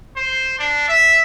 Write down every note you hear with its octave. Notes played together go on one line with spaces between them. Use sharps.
C5
D4
E5